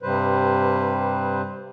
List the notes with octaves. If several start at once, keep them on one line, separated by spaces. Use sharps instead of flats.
G2 C3 G3 B4 C5